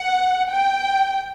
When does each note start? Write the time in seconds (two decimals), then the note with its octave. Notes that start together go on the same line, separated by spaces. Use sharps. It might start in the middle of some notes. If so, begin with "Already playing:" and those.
Already playing: F#5
0.50 G5